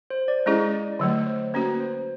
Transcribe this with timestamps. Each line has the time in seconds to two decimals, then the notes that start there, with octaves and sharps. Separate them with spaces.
0.10 C5
0.28 D5
0.46 G#3 C#4 E4 G#4 D#5
0.73 D5
0.93 D5
0.99 D3 F#3 A3 C#5
1.27 C5
1.53 A#3 C#4 F#4 B4
1.80 C5